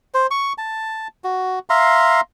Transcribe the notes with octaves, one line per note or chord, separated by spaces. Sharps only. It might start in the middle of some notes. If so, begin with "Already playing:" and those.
C5
C#6
A5
F#4
E5 F5 A#5 C6